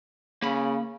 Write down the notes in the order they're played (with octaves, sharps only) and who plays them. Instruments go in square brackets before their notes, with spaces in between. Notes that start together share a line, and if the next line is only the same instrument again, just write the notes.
[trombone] C#3 [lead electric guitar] A#3 B5